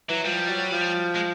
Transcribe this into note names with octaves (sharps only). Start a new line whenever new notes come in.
E3 F#3
F3 G3
F#3
F3
G#3